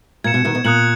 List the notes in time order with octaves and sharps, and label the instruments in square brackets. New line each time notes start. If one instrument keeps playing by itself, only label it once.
[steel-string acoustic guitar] A#2 [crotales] G#6 C#7 E7
[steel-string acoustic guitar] B2
B2 D#3
B2
[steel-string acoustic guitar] A#2 [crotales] D#6 F#6 C#7 F#7